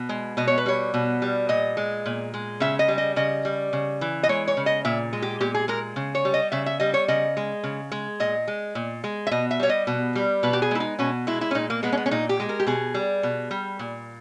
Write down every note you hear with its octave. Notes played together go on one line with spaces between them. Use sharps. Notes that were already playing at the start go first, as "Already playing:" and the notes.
Already playing: B2
G#3
B2 D#5
C#5
B4
G3 C#5
B2
G3
A#2 D#5
G#3
A#2
G#3
C#3 E5
D#5
G3
D#5
C#3 D#5
G3
C#3
E3
D#5
G#3 C#5
C#5
C#3
D#5
A#2 E5
G#3
G4
A#2 G4
G#4
G#3 A#4
C#3
C#5
G3
D#5
C#3 E5
E5
G3 D#5
C#5
C#3 D#5
G#3
C#3
G#3
A#2 D#5
G#3
A#2
G#3
E5
B2 D#5
E5
G3 C#5
D#5
B2
G3
B2 B4
G4
G#4
G#3 E4
D#4
B2 C#4
G#3 E4
E4
C#4
A#2 D#4
A#3
G#3 B3
C#4
B3
C#4
A#2 D#4
G4
G#3
A#4
G4
B2 G#4
G3
B2
G3
A#2